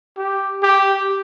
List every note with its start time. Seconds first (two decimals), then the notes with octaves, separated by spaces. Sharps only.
0.17 G4
0.63 G4